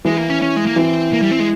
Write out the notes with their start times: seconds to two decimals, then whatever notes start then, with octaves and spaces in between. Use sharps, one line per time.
0.05 E3 G#3
0.17 A#3
0.30 C#4
0.42 C#4
0.56 G#3
0.66 A#3
0.76 E3 C4
1.12 A#3
1.22 G3
1.31 C4
1.40 G#3